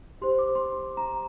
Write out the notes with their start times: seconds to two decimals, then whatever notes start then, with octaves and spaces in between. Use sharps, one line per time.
0.22 G4 C5 C6
0.39 D6
0.55 C6
0.72 C6
0.97 A#5